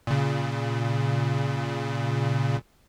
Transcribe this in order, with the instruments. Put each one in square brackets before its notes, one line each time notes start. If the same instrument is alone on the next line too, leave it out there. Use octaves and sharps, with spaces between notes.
[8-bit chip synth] A#2 C#3